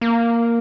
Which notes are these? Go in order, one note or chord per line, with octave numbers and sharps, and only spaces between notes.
A#3